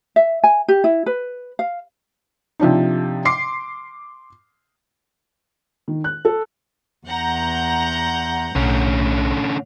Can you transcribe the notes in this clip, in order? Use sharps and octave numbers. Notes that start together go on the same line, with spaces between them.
E5
G#5
G4
E4
B4
F5
C3 F3 D4 D#4
C6 D6 C7
D#3
F#6
A4
E2 F#5 A#5 G6
B1 A2 D3 C#4